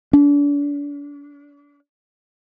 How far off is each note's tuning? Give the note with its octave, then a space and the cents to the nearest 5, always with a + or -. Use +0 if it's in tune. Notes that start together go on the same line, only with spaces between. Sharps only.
D4 -35